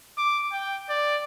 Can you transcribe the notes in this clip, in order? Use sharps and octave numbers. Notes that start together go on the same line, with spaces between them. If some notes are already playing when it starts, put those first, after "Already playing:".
D6
G5
D5